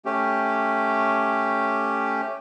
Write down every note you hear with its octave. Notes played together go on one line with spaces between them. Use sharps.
A3 C#4 G4